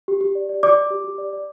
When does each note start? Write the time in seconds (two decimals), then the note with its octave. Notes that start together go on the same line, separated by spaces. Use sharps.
0.08 G4
0.21 G4
0.35 D5
0.49 D5
0.63 D5 D6
0.77 D5
0.90 G4
1.04 G4
1.18 D5
1.33 D5